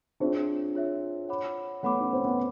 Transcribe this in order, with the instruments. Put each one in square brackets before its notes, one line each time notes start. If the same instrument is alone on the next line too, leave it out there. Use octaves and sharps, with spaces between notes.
[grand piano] C4 D4 [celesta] F4 G#4 C#5 E5
[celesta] F4 G#4 C#5 E5
C#5 F#5 B5 D6
[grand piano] A3 B3 [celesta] C#5 F#5 B5 D6
[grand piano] C#4
C4
B3